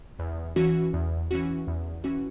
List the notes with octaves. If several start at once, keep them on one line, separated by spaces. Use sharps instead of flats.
E2
E3 C#4 F#4
E2
E3 C#4 F#4
E2
E3 C#4 F#4